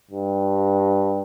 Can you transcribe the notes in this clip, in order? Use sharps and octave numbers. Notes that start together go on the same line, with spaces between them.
G2